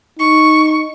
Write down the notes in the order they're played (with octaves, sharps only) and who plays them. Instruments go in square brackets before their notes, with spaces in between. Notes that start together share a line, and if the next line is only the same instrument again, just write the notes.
[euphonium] D#4 [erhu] C#6